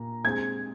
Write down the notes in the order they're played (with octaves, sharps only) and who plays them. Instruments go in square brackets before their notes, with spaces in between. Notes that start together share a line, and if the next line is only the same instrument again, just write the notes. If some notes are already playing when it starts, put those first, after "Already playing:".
Already playing: [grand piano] A#2 A#3 [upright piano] A#5
[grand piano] G#3 C4 G#4 [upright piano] G#6